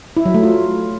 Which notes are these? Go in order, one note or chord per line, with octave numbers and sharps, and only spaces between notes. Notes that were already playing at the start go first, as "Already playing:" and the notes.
E4
F#3
A3
F4